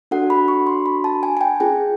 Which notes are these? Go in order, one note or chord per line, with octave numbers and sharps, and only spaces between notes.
D4 F#4 A4 F#5
B5
C#6
C6
B5
A5
G#5
G#5
G5
C#4 F4 G#4 G5